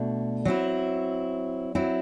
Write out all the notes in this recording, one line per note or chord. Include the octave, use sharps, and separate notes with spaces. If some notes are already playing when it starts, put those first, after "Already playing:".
Already playing: B2 A3 D4
F#3 C4 E4
F#3 C4 E4